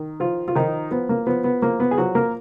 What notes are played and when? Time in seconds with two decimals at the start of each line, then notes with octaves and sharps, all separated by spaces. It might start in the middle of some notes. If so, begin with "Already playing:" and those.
Already playing: D#3
0.20 F3 F4
0.48 F4
0.55 D#3 F3 D#4
0.91 F3 B3
1.09 A#3
1.27 F3 B3
1.44 B3
1.62 F3 A#3
1.80 B3
1.91 G#4
1.98 F3 F#3 F#4
2.15 A#3 A#4